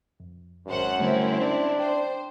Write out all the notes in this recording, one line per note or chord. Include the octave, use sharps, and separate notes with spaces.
F2
G#1 F#2 C5 F#5
D3 G3 A3 C4 E4
C#4 D4
C5 G5